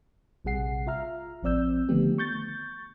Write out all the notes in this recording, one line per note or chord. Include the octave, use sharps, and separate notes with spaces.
A#1 C3 G3 G#4 F#5 C7
F4 E5 A#5 F6
A1 F3 C4 D5 E6 G6
D3 D#3 F3 A3 B3 G4
C#6 G6 A6